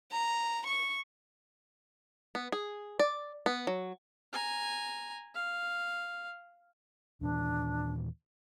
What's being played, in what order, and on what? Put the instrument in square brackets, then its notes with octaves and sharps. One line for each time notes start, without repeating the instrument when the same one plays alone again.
[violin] A#5
C#6
[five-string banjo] B3
G#4
D5
B3
F#3
[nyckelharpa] G#5 A#5
F5
[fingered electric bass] D#2 A#2 E3 [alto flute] D4